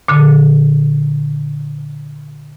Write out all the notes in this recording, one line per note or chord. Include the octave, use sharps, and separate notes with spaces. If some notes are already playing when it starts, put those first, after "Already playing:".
A#2 D3